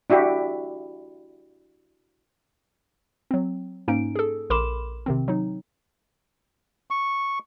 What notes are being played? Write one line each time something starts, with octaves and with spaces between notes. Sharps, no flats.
D4 E4 F#4 G4
F#3 C4
G#2 A#3 C#4 D#4 D7
G#4 A4
A#1 A#4 B5 C6 D6 E7
C3 D#3 C4
F#3 D#4
C#6